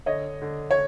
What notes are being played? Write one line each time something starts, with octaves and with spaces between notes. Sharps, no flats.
D3 C#5 D#5
D3
C#5